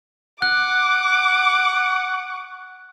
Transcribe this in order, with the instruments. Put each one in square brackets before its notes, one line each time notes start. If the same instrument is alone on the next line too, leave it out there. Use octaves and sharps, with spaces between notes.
[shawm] F#5 [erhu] D6 [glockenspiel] F#6